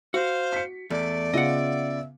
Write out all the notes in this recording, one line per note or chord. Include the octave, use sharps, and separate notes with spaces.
F#4 C5 F5
B6 C#7
E2 A3 D5
C#3 B3 F4 D#5 E5 F#5